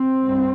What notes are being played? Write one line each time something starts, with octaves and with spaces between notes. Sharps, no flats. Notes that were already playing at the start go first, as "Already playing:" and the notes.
Already playing: C4
G2